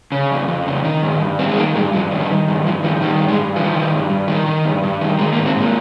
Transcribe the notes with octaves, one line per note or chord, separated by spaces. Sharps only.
C#3
F2
F2
C#3
D#3
G2
G2
D#3 C4
G#3
D#3 A#3
G2 G#3
G2 F3
D#3
G3
D#3
G2
G2 F3
D#3 F3
D#3 G3
G2
G#3
G2
D#3 F3
D#3
G2
G2
D#3
D#3
G2
G2
D#3
D#3 G#3
A#3
G#2
C4
G#2 A#3